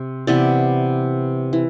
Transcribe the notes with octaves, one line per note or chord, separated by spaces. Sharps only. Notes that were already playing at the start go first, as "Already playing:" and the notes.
Already playing: C3
C3 E3 B3 D5
E3